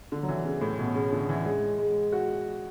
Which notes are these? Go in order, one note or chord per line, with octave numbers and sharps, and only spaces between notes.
D3
F#3
E3
C#3
A2
B2
C#3
D3
E3
G#3
G#3
F#4